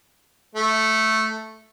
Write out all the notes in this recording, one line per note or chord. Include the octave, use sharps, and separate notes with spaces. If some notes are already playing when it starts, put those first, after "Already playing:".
A3